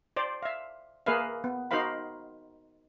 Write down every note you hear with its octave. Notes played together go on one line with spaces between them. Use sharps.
C5 D5
E5 F5
A#3 G#4 A#4 B4 E5 F5
B3
D#4 F#4 A#4 C5 F5 B5